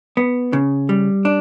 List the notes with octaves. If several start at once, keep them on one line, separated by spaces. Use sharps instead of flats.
B3
C#3
G3
D4